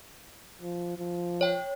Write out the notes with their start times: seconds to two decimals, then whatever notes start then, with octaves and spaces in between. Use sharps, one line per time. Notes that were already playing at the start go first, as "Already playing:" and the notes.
0.61 F3
0.98 F3
1.41 C#5 G5